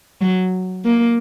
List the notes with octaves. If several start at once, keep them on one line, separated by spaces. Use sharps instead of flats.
F#3
A#3